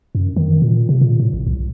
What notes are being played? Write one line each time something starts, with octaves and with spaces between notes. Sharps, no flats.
F#2
D#3
A#2
C3
A#2
A2
G#1
C2